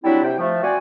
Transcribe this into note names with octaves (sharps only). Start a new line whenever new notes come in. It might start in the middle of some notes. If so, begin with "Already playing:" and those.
F#3 G3 C4 D4 E4
C3 G5
F3 A3
C4 F#4 D5 G#5